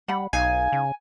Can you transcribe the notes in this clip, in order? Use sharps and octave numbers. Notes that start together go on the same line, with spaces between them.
G3 F#5 B5
B1 D#4 F5 G#5
C#3